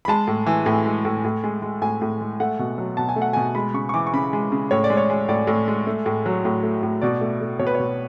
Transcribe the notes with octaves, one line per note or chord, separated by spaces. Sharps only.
B5
G#3 A5
A2
E3
A2 G#5
G#3
A2
A2
G#3
G#3
A2 G#5
A2
G#3
A3 F#5
B2
F#3
B2 A5
G#5
A3
F#5
B2 G#5
G#3 B5
C#3 C#6
C#6
E3 D6
C#6
C#3 B5
G#3
C#3
A2 C#5
D5
G#3
C#5
G#3
A2 D5
A2
G#3
A3
A2
F#3
A2
A3
A2
B2 D5
A3
A3
B2 C#5
B4
B2 C#5